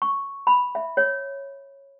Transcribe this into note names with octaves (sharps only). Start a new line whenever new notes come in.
C#6
B5
E5
C#5